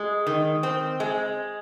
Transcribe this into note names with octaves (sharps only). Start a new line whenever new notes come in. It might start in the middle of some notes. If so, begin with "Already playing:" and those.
Already playing: G#3
D#3
C4
G#3